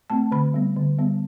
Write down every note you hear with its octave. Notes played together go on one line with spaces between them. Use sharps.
A3 C4 A5
D3 B5
G3 B3
D3
G3 B3